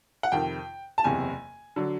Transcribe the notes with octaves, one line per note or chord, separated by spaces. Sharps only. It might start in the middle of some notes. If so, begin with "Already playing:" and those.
F#5
F2 C3 D#3 G5
A5
F#1 E2 C3 G#5
D3 F#3